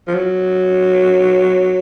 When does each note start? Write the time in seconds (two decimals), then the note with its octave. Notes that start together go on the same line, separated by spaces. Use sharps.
0.08 F3
0.15 F#3